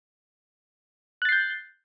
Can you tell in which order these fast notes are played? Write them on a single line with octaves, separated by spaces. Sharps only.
F#6 A6 C7 G6